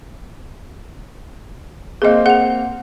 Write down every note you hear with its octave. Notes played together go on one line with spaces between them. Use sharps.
A#3 C4 G#4 D#5 F5
G#4 F#5 F7